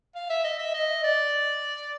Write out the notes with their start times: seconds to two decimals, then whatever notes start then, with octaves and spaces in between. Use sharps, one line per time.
0.15 F5
0.30 E5
0.44 D#5
0.59 E5
0.74 D#5
1.04 D5